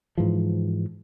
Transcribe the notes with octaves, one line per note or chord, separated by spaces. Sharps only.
G#2 E3 F3